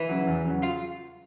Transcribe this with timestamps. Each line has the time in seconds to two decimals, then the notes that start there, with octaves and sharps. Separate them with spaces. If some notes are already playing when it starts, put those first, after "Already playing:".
Already playing: E3 E4
0.09 C#3 F#3
0.27 E2
0.45 C#3 F#3
0.62 F4